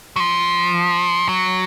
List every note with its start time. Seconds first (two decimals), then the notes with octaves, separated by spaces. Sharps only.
0.16 F#3
0.20 F3
1.29 F#3